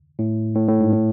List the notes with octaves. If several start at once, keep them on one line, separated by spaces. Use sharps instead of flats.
A2
A2
A2
G#2
A2